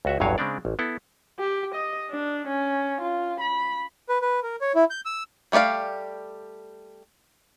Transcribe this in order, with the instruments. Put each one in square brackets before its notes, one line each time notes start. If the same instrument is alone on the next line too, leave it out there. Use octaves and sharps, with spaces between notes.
[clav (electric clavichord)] C#2 F#4 E5
A1 E2 G2 F#3 C#5 F5
C#3 G#3 C4 D4 D5
A1
B3 E4 A4
[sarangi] G4
D#5
D4
C#4
F4
B5
[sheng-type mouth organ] B4
B4
A#4
C#5
E4
G6
E6
[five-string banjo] G3 A3 G4 D5 F5